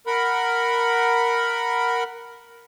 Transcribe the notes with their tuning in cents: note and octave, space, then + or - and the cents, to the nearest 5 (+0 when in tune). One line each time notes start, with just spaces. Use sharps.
A#4 +0 F#5 +0 B5 +0